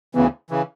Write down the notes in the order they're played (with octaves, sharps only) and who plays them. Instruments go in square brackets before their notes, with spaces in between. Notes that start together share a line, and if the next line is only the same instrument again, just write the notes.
[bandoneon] D2 C#3 E3 [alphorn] B3
[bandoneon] C#3 E3